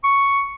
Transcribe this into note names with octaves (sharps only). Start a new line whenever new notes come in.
C#6